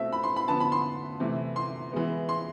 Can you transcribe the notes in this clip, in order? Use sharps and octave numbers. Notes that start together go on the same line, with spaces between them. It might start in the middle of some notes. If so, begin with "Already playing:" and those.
Already playing: B2 A3 C4 E5
B5
C6
B5
D3 F3 B3 A5
B5
C6
C3 E3 A3
C6
E3 G#3 B3
C6